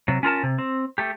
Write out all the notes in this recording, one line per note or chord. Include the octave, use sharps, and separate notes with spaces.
C3 F#3
C#4 F4 A#4 A5
C3
C4
A3 G4